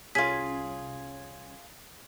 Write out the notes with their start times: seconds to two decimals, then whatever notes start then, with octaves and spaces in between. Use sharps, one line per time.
0.15 C2 C#4 F4 G#4 G#6 B6